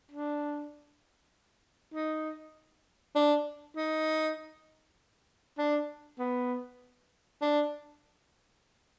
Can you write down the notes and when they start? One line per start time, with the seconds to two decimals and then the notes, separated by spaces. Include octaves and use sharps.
0.11 D4
1.94 D#4
3.16 D4
3.76 D#4
5.58 D4
6.19 B3
7.41 D4